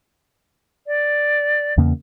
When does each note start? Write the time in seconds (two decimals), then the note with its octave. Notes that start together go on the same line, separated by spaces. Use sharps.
0.86 D5
1.78 E2 C#3 A#3